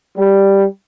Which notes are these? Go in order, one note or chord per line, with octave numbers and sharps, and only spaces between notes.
G3